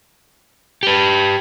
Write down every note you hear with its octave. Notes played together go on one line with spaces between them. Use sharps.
G4 B4